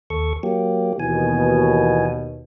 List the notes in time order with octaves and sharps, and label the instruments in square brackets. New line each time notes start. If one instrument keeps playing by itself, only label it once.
[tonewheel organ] D#2 A4 C#6
F#3 A#3 G4
[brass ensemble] D#2 B2 [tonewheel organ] E3 G#5